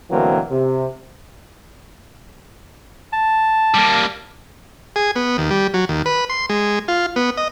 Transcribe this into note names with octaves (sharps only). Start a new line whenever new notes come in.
D2 B2 E3 F#3 A#3 C4
C3
A5
G3 A#3
G#4
B3
D#2
G3
F#3
D#2
B4
C6
G#3
F4
B3
D#5